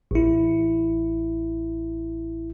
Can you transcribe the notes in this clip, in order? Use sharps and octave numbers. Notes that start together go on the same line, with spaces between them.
A1 E4